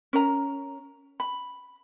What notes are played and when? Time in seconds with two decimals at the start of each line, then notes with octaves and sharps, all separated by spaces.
0.13 C#4 A#4 A#5
1.20 B5